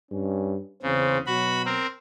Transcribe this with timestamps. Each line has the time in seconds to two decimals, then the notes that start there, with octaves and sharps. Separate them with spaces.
0.12 G2 C#4
0.83 E2 C#3 C4 C5
1.26 B2 F#3 F#4 B5
1.65 C4 A#4